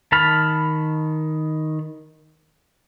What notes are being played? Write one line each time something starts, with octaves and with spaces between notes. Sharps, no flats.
D#3 A5 B5 F6